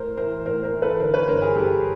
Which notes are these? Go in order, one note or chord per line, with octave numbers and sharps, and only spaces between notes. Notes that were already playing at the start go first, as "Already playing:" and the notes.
Already playing: A2 A#4 C5
E3 A#4 C5
A2 A#4 C5
A#4 C5
E3
A4 B4
D3 A#4 C5
B4 C#5
G2 A#4 C5
G#4 A#4
G2 G4 A4